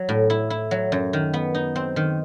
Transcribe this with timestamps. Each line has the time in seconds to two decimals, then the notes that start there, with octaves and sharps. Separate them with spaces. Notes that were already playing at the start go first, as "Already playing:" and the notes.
Already playing: F#3
0.09 A2
0.30 E4
0.50 E4
0.71 F#3
0.92 F#2
1.13 D#3
1.34 B3
1.55 D#4
1.76 C4
1.96 D#3